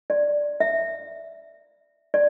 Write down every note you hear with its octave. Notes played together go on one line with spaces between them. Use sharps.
D5
E5
D5